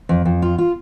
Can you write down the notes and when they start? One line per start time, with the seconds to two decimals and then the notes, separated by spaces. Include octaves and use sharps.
0.09 F2
0.25 F2
0.42 F4
0.58 F4